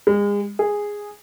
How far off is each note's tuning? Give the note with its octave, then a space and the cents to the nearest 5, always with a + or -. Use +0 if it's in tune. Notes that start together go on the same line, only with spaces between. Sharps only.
G#3 -35
G#4 -10